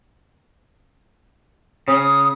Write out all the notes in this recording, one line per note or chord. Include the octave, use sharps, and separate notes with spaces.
C#3 C#4 D#6